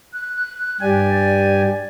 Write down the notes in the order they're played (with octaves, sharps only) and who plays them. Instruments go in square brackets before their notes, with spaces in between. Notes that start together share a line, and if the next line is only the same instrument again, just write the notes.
[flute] F#6
[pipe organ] G2 G4 G#5 [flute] D5